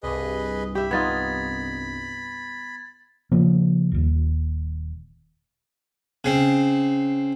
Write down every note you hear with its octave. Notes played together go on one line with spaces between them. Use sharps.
C2 G2 G#4 B4 D#5
G4 E5 B5
B3 D#4 F4 G#6 A6
C#3 F3 A#3
D#1 D#2
C#3 C4